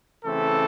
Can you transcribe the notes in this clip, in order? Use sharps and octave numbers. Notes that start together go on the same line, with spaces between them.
C#3 E3 A3 C4 A4